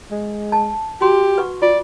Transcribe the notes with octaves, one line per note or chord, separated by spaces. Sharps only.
G#3
A5
F#4 G4 C6
B4 F#5 C#6
F4 D5